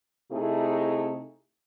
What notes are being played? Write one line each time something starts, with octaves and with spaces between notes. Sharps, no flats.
C3 A3 C4 D#4 E4 G#4